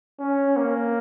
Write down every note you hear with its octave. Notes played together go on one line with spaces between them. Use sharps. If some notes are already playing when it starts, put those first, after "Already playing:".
C#4
A#3